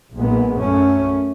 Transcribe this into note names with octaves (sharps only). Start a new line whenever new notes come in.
B1 A#2 G#3 B3
F#2 A3 C#4